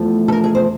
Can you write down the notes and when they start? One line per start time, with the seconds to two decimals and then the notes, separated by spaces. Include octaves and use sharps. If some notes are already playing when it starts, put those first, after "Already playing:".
Already playing: E2 F3 A3
0.28 A4
0.32 A#4
0.44 G#4
0.55 C5